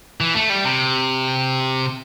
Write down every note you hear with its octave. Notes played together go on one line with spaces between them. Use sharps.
E3
A3
G3
C3